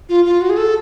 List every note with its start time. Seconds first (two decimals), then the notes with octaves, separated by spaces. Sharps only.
0.09 F4
0.25 F4
0.41 F#4
0.50 G#4
0.57 A4